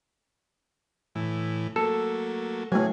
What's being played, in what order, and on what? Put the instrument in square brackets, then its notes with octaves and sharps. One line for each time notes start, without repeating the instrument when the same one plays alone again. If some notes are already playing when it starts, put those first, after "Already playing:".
[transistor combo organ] A2 E3
[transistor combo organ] F#3 A3 A#3 [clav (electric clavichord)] A4
[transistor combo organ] C#3 G#4 G#5 [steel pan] F#3 A3